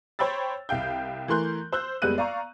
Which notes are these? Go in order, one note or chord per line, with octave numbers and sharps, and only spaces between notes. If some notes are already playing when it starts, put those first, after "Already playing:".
C5 C#5 G5 B5 E6 A6
C2 F5 G5 G6
E3 A3 A#4 C6 F#6 G6
C5 E6 F#6 G6
F#1 G3 G#3 B3 F#6 D#7
D5 F5 A#5 C#6